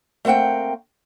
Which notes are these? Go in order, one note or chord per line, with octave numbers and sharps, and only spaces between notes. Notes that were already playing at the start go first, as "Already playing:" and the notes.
A3 A#3 C4 F#5 G5